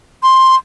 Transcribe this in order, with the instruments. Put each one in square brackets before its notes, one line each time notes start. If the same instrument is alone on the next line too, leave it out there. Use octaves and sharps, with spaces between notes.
[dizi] C6